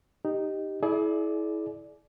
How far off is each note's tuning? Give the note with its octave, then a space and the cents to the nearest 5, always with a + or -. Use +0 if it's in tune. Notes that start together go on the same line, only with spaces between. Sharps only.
D#4 -5 G4 +0
E4 -15 G#4 +40 D5 +0